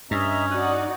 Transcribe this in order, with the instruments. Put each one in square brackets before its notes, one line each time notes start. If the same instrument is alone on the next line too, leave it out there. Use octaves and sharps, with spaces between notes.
[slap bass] G2 [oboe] C#4 [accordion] D#5 E5 A#5
[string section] D#4 F#4 D5 [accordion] D#6 F#6